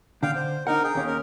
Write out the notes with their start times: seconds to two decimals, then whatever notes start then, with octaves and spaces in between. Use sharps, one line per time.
0.23 D3 D4 F5 G5
0.35 C5
0.67 D4 D#4 A#4 F#5
0.84 G#4 G5
0.95 D#2 C#4
1.07 A#4